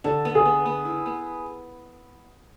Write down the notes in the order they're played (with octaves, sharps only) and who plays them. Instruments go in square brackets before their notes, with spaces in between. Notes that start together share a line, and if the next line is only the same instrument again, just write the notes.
[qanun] D3 [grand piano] A4
[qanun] B3
[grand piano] G#4
[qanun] B3
B3
E4
B3